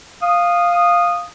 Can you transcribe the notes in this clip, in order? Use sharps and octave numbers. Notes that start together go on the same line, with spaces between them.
F5 D#6